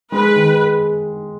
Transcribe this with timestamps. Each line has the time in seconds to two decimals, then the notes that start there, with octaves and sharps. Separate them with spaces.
0.12 G#3 B4
0.36 D#3